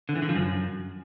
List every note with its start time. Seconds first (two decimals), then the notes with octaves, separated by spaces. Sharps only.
0.09 D3
0.16 E3
0.22 D3
0.29 F3
0.36 F#2